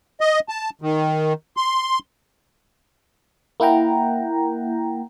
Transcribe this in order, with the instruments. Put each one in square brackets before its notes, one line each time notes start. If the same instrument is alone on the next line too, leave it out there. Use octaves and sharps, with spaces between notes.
[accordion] D#5
A5
D#3
C6
[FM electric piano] A#3 E4 F#5 G5 A#5